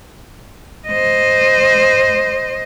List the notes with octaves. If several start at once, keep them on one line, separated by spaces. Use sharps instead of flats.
C5 D#5